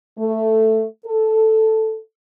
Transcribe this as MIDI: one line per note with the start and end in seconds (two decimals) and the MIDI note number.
0.18 0.85 57
1.05 1.97 69